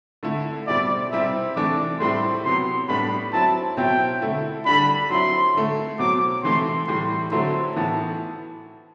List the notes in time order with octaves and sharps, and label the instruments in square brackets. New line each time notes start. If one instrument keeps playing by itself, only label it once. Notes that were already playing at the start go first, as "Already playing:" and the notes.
[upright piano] D3 A3 E4
[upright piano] B2 G3 C4 E4 [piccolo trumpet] D5
[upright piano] C3 G3 C4 E4 [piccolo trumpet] E5
[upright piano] C3 E3 A3 D4 [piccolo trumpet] D6
[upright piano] A2 G3 C4 E4 [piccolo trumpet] C6
[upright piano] C3 F#3 B3 [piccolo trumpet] C6
[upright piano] A2 G3 B3 D4 [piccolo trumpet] B5
[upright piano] F#3 C4 E4 [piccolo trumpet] A5
[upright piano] B2 F#3 C4 E4 [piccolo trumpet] G5
[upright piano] D3 A3 E4
[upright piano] D3 G3 D4 [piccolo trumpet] B5
[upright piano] F#3 C4 E4 [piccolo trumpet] C6
[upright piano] D3 A3 E4
[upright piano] B2 F#3 C4 [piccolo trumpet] D6
[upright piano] C3 E3 A3 E4 [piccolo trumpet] C6
[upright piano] A2 E3 G3 [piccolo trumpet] C6
[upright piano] D3 F#3 A3 C4 E4 [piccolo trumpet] C6
[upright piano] A2 E3 B3 E4 [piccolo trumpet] A5